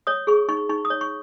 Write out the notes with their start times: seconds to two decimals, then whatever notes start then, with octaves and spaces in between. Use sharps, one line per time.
0.07 C#5 D#6
0.27 G#4 C#6
0.49 D#4 C#6
0.69 D#4 C#6
0.85 D#6
0.90 C#5
1.01 C#6